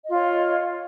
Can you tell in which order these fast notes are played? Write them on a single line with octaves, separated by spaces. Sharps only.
D#5 F4 C#5